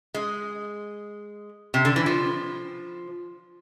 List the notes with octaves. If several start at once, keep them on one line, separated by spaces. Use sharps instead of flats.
G#3
C3
D3
E3
F3